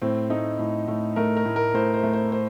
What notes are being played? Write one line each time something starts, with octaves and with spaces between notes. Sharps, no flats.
A2 C4
A3 D#4
A2
A2
A3 A#4
A#4
A2
A#4
A2 C5
C5
A3
C5
C5